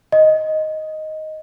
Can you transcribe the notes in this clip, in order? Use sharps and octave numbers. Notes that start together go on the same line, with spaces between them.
D#5